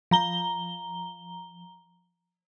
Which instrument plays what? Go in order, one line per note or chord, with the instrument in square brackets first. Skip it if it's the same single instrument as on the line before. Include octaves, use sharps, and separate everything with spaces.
[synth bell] F3 A#5 G7